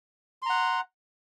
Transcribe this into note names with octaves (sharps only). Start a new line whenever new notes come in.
F#5 A#5 C6